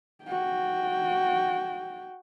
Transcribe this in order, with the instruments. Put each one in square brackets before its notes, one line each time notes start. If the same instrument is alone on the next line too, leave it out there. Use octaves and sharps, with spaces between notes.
[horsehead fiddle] F#4 G5